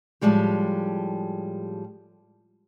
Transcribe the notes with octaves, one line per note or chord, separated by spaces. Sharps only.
A2 F3 G3 G#3 G4